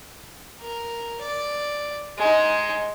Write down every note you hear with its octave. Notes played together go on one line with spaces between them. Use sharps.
A#4
D5
G#3 D#4